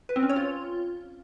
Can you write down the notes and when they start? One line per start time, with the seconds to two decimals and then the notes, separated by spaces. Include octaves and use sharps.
0.09 B4
0.16 C4
0.23 C#4
0.30 C#5
0.36 F4